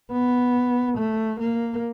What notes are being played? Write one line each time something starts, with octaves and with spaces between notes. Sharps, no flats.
B3
A3
A#3